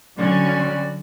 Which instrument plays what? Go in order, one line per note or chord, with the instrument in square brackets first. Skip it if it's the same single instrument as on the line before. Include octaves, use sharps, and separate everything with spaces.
[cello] D3 [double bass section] F#3 [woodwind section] G3 F#4 D5 [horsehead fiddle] C#4